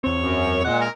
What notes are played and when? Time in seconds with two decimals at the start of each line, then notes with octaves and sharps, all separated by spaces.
0.04 E2 C4 C#5
0.20 F#2
0.65 A#2 G#3 F#5
0.81 A#4